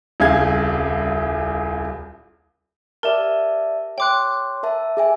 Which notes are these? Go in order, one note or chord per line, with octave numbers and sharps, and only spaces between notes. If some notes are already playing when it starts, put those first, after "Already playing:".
D#1 C2 C#3 G#4 F5 G#6
G4 A#4 D5 E5 A5
C#5 G5 C6 D6 F#6
A#4 E5 A5
G#4 E5 G#5